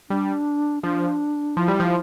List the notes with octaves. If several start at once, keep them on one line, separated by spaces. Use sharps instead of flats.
G3 D4
F3 D4
F3 E4
G3
F3